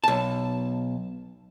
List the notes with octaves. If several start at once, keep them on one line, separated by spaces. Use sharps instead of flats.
B1 A5